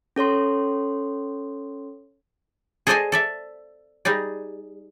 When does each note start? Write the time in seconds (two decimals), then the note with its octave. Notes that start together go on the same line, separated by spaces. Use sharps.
0.16 C#4 A4 C#5 C6
2.87 G#4 A4 C5 D5 D#5 G#5
3.12 A4 D5 E5
4.05 G3 D#4 G#4 D5